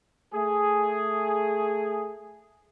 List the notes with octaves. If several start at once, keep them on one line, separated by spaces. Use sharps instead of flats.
A3 G#4